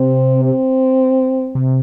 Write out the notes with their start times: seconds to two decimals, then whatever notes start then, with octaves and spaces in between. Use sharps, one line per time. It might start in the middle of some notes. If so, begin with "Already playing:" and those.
Already playing: C3 C4
0.45 C4
1.55 C3